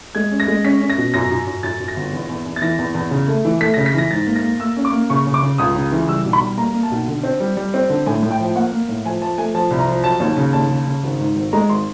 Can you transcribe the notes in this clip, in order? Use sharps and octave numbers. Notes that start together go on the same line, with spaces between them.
G#3 G#6
C#4
A#6
G#3
C#4 B6
C#4
A#6
B2
F#2 A#6
F#2
F#2
F#2 A6
F#2
A#6
G1
E2
E2
E2
A6
E3 A#6
E2
E2
C#3
A3
E3
A3 B6
C#3 A#6
B6
E3 A#6
G#2 A6
A#3
A#6
A#3
A#3 E6
C#4
D6
A#3
C#3 C#6
C#3
D6
C#3
C#2 D#6
C#3
E3
G3 E6
B1
B5
G3
A#3 A#5
A#3
A5
B1
D3
C4
G3
G3
C4
D3
A2 G#5
A2
G5
F3
A#3 F#5
A#3
A2
F3 G#5
F3 A5
A3 G#5
F3 A5
C2
A#5
F3
F#3 A5
D#2
C#3
D#2 A5
C#3
C#3
G#1
G#2
G#1
G#3 A#5
G#1 C6